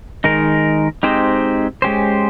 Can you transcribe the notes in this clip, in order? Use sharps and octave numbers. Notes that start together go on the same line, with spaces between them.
D#3 G#3 D#4 A#4
G#3 C4 D#4 G4 C5
G#3 C#4 G4 C5